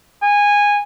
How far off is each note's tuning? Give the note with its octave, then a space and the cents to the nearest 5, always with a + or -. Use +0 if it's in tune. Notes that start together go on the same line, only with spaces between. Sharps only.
G#5 -15